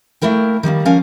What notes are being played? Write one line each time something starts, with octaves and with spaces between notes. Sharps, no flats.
A3 A#3 E4 A#4 G5
D#3 G3 A3 A#3
F3 C#4 A#4 F5 G#5